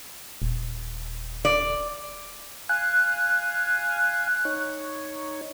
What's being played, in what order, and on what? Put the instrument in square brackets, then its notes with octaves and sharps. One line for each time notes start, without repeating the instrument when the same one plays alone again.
[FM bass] D#1
[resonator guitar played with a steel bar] D5
[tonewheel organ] F5 G#5 [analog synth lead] F#6
[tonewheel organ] D#4 C#5